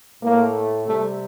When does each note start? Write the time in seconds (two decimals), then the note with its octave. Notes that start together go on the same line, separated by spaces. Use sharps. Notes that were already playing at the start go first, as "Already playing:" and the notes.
0.22 A2 A3 A#3
0.86 C3 G3 A3